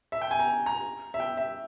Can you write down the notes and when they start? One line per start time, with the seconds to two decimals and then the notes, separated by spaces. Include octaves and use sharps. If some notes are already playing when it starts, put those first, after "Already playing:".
0.12 E5
0.22 G5
0.31 G#5
0.39 A#5
0.66 A#5
1.14 E5
1.20 G5
1.37 E5